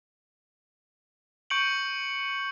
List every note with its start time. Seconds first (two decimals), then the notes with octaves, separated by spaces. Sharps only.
1.50 C#6 G6 C#7 D7 F#7